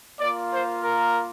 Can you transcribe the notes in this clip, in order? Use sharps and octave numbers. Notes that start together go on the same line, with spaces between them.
A#3 F4 D5
C5
A#4